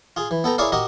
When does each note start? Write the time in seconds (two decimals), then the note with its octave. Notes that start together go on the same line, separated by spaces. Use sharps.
0.16 F4 G#4
0.31 E3
0.44 B3 A4 G5 A#5
0.58 E4 G#4 A#4 C#5 D5 F5
0.72 F#4 G4 A#4 D#5